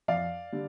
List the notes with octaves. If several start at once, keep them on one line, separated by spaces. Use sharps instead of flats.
F2 D5 F5
D3 G3